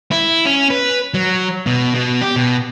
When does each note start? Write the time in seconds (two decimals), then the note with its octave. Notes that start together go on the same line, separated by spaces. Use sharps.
0.11 E4
0.45 C#4
0.70 B4
1.14 F#3
1.67 B2
1.95 B2
2.22 G4
2.36 B2